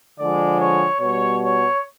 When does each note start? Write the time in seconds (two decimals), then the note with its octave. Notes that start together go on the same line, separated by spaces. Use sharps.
0.19 D3 F3 G#3 D5
0.60 C#5
1.00 B2 G3 C#5
1.42 C#5